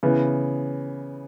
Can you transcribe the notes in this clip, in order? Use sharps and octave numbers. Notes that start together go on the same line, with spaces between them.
C#3 E3 B3